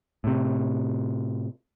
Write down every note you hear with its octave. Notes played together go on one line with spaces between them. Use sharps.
A2 C3